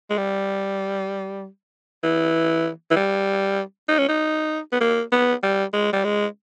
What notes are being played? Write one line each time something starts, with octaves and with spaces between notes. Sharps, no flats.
G#3
G3
E3
E3
G3
D#4
C#4
D#4
B3
A#3
B3
G3
G#3
G3
G#3